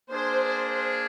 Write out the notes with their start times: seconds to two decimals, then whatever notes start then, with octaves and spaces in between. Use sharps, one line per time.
0.11 A#3 D4 G#4 C5
0.45 C5